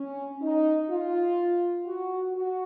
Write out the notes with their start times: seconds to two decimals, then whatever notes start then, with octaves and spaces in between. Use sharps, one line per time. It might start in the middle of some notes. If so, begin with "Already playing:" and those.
Already playing: C#4
0.41 D#4
0.90 F4
1.86 F#4
2.35 F#4